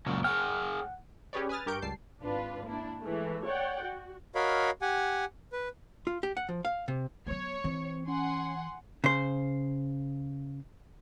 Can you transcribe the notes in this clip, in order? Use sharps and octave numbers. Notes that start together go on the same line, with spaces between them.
C#2 F#2 A#2 F#3 C#4
G#4 C#5 F#5 G5 F6
C#4 G4 G#4 B4 C#5 D5
B4 G#5 D#6 F6 A6
G2 G4 A#4 C#6 G6 D7
C#2 G3 A5 C7
G#1 D4 F4 B4
A#3 D4 E4
E3 G#3 A3
C#5 D5 F#5 G5
F#4
F#4 A#4 C#5 D#5 F5 B5
G4 F#5 G#5
B4
F4
G4
F#5
F3
F5
C3
F#3 B3 C#5 G#6
E3 C4
C#4 F#5 G#5 C6
C#3 C5